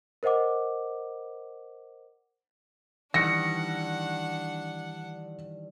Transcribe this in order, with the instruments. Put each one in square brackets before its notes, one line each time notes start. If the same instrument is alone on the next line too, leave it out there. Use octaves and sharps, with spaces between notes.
[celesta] A#4 C5 D#5 F#5 D6
[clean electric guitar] D#3 E3 G3 [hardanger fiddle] D4 F#5 [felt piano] A#6 C#7